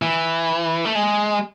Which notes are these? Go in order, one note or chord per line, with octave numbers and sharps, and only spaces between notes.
E3
A3
G#3